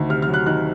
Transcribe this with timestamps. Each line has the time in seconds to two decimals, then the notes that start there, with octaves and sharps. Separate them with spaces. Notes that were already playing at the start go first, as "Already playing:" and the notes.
Already playing: D2 D#3
0.09 C3 F6
0.22 F6
0.27 F#3
0.34 F#6
0.46 D#3 F#6